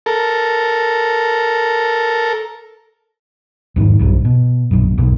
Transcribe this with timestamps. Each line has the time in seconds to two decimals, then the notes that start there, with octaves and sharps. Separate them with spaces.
0.06 A4 A#4
3.76 E2 G#2 D#3
3.99 B1 G2 C3
4.25 B2
4.71 A#1 F#2
4.98 B1 E2 B2